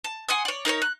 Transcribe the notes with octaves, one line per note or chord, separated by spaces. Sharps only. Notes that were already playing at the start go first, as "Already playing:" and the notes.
A5
F#5 G#5 C6 D#6
C#5 D5
D#4 A#4 B4 C#5
F#6